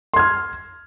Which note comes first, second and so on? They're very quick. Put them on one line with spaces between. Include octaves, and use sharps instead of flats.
C6 G#6 F6